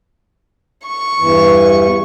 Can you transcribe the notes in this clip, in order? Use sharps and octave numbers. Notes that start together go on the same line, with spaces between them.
C#6
E2 G2 E3